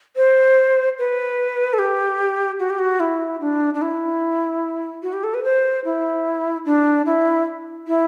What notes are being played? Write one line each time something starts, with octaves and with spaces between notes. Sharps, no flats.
C5
B4
A4
G4
F#4
G4
F#4
E4
D4
D4
E4
F#4
G4
A4
B4
C5
E4
D4
E4
E4